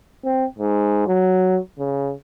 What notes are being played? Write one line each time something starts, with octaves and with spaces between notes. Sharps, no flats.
C4
G#2
F#3
C#3